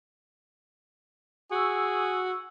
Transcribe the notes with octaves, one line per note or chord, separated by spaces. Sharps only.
F#4 G#4 C#6 E6